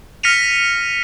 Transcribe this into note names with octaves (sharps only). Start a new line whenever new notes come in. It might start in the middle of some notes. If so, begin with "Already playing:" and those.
F6 A#6 B6 C#7 D#7 F7